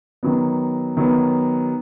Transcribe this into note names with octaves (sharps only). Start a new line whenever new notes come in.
D#3 F#3 B3
D#3 F#3 B3